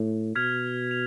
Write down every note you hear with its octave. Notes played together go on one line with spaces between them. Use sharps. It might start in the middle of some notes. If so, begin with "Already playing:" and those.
Already playing: A2
B2 F6 G#6 B6 F7
F7